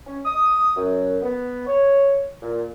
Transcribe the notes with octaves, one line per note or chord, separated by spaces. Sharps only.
C#4
D#6
F#2
B3
C#5
A#2